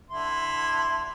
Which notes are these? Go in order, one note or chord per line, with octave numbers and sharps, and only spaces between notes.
D3 E4 C6